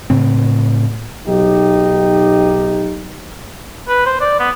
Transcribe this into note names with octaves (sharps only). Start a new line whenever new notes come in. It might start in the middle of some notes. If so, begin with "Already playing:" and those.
A2 C#3 C4
B1 F#3 D#4 G4
B4
C5
D5
B3